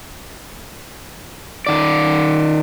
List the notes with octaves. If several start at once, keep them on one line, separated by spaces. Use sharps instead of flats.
D#3 D5